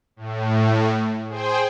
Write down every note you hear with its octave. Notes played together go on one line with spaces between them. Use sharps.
A2
G#4 C5 G5